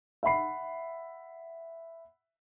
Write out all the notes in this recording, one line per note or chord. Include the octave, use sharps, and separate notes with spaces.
E5 F#5 B5 C7